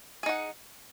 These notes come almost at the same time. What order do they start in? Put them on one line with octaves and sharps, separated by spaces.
G#4 D#4 F#5